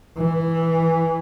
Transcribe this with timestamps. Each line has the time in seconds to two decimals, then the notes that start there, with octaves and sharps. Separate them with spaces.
0.18 E3